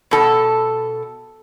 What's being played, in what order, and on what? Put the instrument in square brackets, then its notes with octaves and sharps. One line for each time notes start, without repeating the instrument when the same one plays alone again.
[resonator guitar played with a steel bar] B2 A4